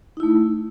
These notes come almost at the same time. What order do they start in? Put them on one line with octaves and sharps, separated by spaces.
D#4 E4 A3